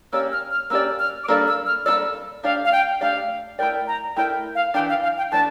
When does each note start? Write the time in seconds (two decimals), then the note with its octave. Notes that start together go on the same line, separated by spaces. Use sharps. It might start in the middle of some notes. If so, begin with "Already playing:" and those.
0.13 A#3 C#4 G4 D5 E6
0.32 F6
0.51 F6
0.70 A#3 C#4 G4 D5 E6
0.99 F6
1.24 D6
1.28 G3 A#3 D4 A4 D5 E6
1.47 E6
1.66 F6
1.86 G3 A#3 D4 A4 D5 E6
2.43 A3 D4 G4 D5 F5
2.65 F5
2.72 G5
3.01 A3 D4 G4 D5 F5
3.59 A3 E4 A#4 D5 G5
3.87 A#5
4.16 A3 E4 A#4 D5 G5
4.55 F5
4.74 E3 A3 D4 G5
4.89 F5
5.03 F5
5.18 G5
5.32 E3 A3 D4 A5